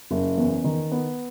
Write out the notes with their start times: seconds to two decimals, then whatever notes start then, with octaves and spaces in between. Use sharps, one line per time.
0.11 F#1
0.38 E2
0.64 D#3
0.92 B3